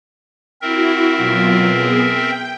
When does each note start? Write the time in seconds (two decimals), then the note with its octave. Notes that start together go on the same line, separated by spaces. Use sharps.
0.62 C4 E4 F#4 A#4 E5
1.16 B2 F#3 F4
1.67 B3 G#4
2.07 G5